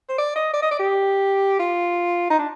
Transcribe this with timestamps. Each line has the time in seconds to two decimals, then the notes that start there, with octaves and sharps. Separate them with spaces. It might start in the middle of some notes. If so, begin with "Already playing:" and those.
0.09 C5
0.18 D5
0.36 D#5
0.54 D5
0.63 D#5
0.71 D5
0.80 G4
1.59 F4
2.30 D#4
2.39 D4